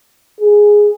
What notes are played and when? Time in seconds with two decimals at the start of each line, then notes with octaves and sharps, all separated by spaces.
0.40 G#4